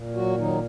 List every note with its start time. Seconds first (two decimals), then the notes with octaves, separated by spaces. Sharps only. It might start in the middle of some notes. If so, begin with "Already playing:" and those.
Already playing: A#2
0.15 F#3 F#4
0.37 D#3 F#3 D#4